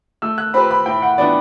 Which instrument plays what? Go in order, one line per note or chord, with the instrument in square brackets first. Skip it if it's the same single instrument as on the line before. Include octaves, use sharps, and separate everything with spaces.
[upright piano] A3 [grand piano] E6
[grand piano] F#6
[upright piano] C4 G4 B4 [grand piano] B5
[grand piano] B5
[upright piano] A2 [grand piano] G5
[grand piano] F#5
[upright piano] E3 B3 D4 [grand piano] D5